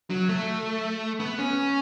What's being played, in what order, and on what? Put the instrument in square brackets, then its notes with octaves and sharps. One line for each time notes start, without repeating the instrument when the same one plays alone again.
[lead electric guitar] F#3
A3
B3
C#4